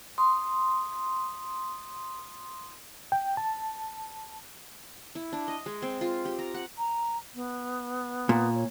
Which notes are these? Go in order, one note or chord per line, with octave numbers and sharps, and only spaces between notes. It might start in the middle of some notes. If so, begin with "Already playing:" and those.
C6 D#6
G5
A5
E4
D4
D#5
G#3
C4
F4
G4
A#5
F#5
A#5
B3
A#2
C#5